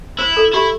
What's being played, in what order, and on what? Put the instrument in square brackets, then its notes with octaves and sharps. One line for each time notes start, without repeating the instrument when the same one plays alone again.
[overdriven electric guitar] E4 [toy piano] C5
[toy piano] A4
[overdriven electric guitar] E4 [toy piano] G4